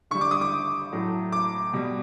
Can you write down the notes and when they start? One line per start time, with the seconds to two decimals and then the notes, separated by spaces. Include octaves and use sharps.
0.11 D3 C#6
0.14 G3
0.21 D6
0.31 D#6
0.41 D6
0.92 A2 F#3 A3
1.32 D6
1.73 B2 G3